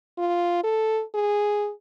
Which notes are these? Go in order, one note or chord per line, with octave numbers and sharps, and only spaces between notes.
F4
A4
G#4